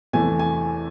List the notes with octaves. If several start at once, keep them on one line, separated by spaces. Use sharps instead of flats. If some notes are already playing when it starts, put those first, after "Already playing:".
E2 C3 E3 A3 G#5
G#5